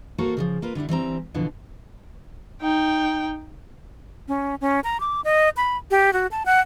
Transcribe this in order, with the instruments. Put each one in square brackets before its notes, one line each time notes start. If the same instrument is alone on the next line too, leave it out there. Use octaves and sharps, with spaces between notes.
[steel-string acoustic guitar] A#3 F#4 A4 A#4 C5
C#3 E3 F3
A#3 F4 B4
D3 G3 D4 E4
E3 G3 C4 A#5
B2 D3 E3 F3
[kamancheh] D#4 G5
[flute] C#4
C#4
A#5
D6
D#5
B5
G4
F#4
A5
F#5